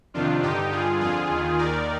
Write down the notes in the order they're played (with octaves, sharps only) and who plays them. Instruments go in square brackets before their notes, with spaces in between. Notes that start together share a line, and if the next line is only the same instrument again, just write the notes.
[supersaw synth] F2 C3 D#3 D4 F4
G2 D3 D#4 G4
G2 D3 F4 G#4
F2 D3 F4 G#4
D#2 D#3
D#2 D#3 A#4 D5